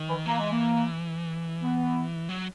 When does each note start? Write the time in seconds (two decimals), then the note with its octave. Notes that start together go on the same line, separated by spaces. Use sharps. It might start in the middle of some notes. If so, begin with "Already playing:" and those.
Already playing: D#3
0.08 E3
0.26 E3 A#3
0.38 G#3
0.51 A#3
1.62 B3
2.29 F#3